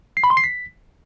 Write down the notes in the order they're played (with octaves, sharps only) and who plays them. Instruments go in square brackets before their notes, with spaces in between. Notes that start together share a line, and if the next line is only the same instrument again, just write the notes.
[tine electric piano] C7
B5
C6
C7
B6